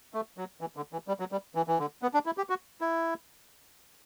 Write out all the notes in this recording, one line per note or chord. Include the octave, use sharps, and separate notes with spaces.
A3
F#3
E3
D3
E3
G3
F#3
G3
E3
E3
D3
B3
D4
E4
G4
F#4
E4